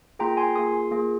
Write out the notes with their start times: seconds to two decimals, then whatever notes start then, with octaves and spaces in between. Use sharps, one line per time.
0.19 A#3 F4 G#4 G5 A#5
0.37 G#5 C6
0.55 A#3 F4 G#4 C6 D#6
0.91 A#3 F4 G#4